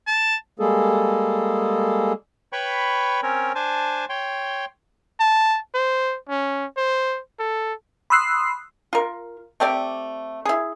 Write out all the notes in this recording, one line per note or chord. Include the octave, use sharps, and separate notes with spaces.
A5
G3 G#3 A#3 G#4 A4
B4 C#5 G5 B5 C#6
C4 C#4 A#4 C#5
D4 C5 G#5 A5
C#5 G5 C6
A5
C5
C#4
C5
A4
B5 C6 D#6 E6 F#6 C7
F4 A#4
A3 C4 G4 D5
E4 G#4